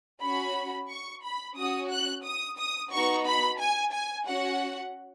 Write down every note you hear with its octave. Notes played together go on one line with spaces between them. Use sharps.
C#4 F#4 B5
C#6
B5
C#4 F#4 D#6
F#6
D#6
D#6
B3 D#4 F#4 C#6
B5
G#5
G#5
C#4 F#4 F#5